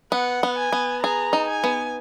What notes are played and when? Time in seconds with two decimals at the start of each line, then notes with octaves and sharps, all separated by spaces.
0.12 B3 F#5
0.43 B3
0.58 G#5
0.73 B3
1.03 G#4 A#5
1.33 D#4
1.48 G#5
1.64 B3